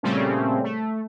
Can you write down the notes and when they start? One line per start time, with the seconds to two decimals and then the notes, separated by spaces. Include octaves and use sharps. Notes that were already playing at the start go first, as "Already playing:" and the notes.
0.03 A#2 C#3 G3 A3 C4 C#4
0.64 A3